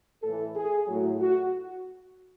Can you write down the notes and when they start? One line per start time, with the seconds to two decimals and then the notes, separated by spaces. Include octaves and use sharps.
0.23 A2 E3 A4
0.56 G#4
0.88 A2 F#3 F#4
1.20 F#4